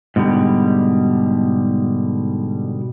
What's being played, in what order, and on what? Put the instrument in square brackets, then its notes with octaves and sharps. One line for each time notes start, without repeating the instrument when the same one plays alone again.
[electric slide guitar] G#2 B2 D3 G3